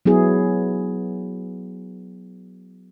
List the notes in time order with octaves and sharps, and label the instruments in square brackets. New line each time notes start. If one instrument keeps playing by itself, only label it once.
[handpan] F#3 B3 E4 G#4